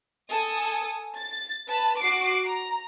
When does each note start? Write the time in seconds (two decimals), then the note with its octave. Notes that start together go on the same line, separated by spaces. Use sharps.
0.30 A4 G#5 D#6
1.16 A6
1.66 B4 A5
2.01 F#4 D6 C7
2.46 A#5